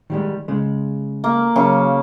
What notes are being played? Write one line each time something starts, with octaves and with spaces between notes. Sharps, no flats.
D#3 G3 G#3
C#3 G#3
A#3
C#3 F#3 A#4